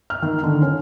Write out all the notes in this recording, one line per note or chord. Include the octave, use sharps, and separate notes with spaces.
F6
D#3
D3
C#4